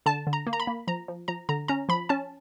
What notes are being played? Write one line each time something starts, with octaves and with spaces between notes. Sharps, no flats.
D3 A5
D3
A#5
A#3
A#5
B5
A#3
F3 A#5
F3
F3 A#5
D3 A#5
C#4 A#5
F3 B5
C#4 A5